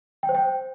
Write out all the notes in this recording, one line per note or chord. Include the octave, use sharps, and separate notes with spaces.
G5
C5
G5